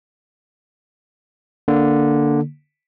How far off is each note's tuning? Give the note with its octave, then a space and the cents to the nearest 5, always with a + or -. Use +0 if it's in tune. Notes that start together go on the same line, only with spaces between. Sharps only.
D3 +0 A#3 +0